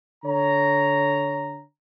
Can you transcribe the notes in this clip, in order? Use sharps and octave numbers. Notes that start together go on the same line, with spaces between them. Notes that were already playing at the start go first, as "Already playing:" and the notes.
D3 C#5 A#5